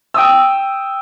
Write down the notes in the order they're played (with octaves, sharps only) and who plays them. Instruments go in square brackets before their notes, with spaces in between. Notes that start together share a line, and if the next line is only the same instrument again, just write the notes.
[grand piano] G5 D#6 E6